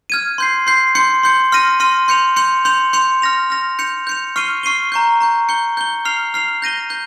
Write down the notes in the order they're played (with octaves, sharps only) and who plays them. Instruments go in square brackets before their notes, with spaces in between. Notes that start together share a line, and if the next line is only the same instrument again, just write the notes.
[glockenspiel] F6 G#6 D#7
C6 G6 C7
C6 G6 C7
C6 G6 C#7
C6 G6 C#7
C6 F6 A#6 D#7
C6 F6 A#6 D#7
C6 G6 C#7 F7
C6 G6 C#7 F7
C6 G6 C#7 F7
C6 G6 C#7 F7
F6 A#6 F7
F6 A#6 F7
G6 C#7 F7
G6 C#7 F7
C#6 F6 C7 D#7 G7
C#6 F6 C7 D#7 G7
A#5 C#6 G6
A#5 C#6 G6
G6 C#7 G7
G6 C#7 G7
F6 C7 F7
F6 C7 F7
G6 A#6 D#7 G7
G6